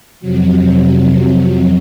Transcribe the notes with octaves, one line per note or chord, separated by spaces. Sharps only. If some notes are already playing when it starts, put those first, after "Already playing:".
F2 C3 F#3